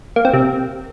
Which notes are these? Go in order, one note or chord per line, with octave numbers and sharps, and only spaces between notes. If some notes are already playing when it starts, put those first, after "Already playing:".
A#3
C4
C3